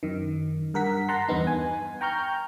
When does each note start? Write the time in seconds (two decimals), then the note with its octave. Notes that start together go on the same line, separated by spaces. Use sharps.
0.03 F#2 D#3
0.74 G2 A#4 F#5 B6
1.09 F#5 A5 A#5 C6
1.28 E2 G2 B3 D#4
1.47 G#5
2.01 G5 A#5 C#6 F6 G6